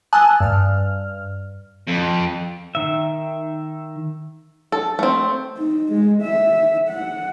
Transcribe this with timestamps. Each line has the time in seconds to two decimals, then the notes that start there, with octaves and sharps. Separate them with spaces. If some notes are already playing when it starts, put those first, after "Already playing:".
0.13 G#5 A5 D#6 E6 F#6
0.40 G2 F6
1.87 F2
2.75 D#3 E5
4.72 A4
4.99 A3 C4
5.58 D#4
5.92 G#3
6.22 E5
6.89 F#5